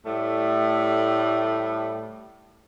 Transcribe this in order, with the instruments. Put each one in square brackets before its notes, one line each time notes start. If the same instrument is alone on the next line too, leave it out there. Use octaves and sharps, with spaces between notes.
[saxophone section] A2 G3 A3